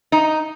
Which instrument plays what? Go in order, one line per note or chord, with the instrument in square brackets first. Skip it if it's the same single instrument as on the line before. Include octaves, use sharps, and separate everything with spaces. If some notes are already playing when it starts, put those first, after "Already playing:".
[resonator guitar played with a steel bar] D#4